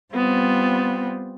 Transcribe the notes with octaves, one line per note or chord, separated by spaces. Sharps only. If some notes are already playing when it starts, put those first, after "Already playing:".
G3 B3 C4 F4